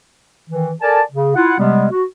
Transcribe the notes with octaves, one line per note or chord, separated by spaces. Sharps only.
D#3 E3
A4 A#4 D5 G#5 A5
C#3
E4 F4 F#5
C3 G3 G#3 B3
F#4